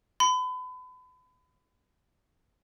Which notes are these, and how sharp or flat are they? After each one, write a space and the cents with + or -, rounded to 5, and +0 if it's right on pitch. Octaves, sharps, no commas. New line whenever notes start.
B5 +35